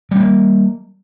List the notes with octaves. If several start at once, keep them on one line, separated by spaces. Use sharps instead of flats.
G3 A#3 C4